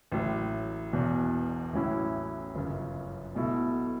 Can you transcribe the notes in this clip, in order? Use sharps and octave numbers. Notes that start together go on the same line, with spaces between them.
A1 A2 F#3
E1 E2 B2
A1 A2 F#3 C#4 E4
G1 F#2 C#3
B1 B2 A3 E4